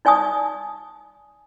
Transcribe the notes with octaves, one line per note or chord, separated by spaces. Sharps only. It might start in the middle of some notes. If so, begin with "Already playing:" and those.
D#4 D5 G#5 A5 D#6